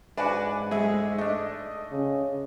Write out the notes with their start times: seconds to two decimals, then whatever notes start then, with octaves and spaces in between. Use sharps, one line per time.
0.17 G#2 D4 F#4 B4 D5 G#5
0.71 G#3 A3 G#4 E5
1.18 A3 D4 D#5
1.92 C#3